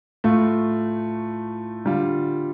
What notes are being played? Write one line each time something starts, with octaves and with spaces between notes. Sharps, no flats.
A2 A3 F4
D3 G3 F4